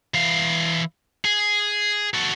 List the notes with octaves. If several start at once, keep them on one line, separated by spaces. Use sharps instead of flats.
E3 F5
G#4
F#4 A4